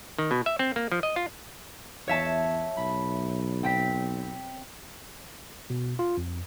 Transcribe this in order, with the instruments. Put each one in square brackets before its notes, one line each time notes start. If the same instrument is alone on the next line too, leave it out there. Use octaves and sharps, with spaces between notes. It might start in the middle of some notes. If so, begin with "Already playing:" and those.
[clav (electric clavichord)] D#3
B2
E5
C4
A#3
F3
D#5
F4
[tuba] E2 [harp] C#5 E5 A5
[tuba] B1 [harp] B5
[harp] C4 G5 B6
[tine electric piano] B2
F4
F2